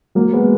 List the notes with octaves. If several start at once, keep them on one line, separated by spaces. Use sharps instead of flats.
F#3 A#3
G#3 B3